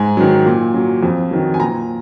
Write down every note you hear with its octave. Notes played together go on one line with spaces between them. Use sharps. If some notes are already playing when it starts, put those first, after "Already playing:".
Already playing: G#2 G#5
D#3 F#3
A#2
F#3
F2
D#3 F#3
G#5
A#2 A#5